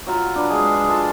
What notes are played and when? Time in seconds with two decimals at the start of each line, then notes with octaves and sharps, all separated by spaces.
0.07 F#3 F4
0.36 D4 B4
0.49 G#3 G#4
0.88 F4 A4 A5 C6